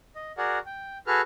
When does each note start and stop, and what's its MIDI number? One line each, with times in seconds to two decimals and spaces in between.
0.15 0.32 75
0.38 0.59 66
0.38 0.59 68
0.38 0.59 70
0.38 0.59 74
0.38 0.59 78
0.66 0.98 79
1.07 1.21 66
1.07 1.21 68
1.07 1.21 69
1.07 1.21 71
1.07 1.21 89